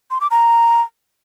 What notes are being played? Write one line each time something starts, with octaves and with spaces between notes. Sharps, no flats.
C6
D6
A#5